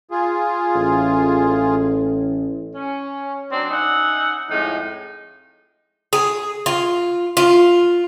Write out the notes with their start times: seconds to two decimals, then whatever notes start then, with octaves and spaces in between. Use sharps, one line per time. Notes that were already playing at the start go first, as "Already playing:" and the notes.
0.11 F4 G#4
0.75 A1
2.75 C#4
3.52 F#3 C4 D4
3.71 C#4 D#4 E5 F#5
4.51 F2 A2 G#3 D#4
6.13 G#4
6.66 F4
7.37 F4